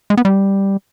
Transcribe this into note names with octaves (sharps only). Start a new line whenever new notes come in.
G#3
B3
G3